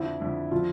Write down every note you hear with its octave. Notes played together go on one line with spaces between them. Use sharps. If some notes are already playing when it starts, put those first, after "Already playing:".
Already playing: F2 D3 F3 E4
F2 D3 F3
D3 F3 F4